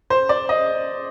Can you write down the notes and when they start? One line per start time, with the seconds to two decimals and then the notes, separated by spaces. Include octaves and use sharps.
0.10 C5
0.29 D5
0.49 D#5